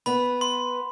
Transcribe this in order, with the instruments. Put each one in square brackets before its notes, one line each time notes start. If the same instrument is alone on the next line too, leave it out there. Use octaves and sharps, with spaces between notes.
[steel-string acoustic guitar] B3 B4 [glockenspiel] B5
[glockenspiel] C6